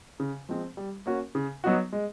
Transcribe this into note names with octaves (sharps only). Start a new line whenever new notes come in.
C#3
F3 G#3 C4
G3
A#3 C#4 F#4
C#3
F#3 B3 D#4 F#4
G#3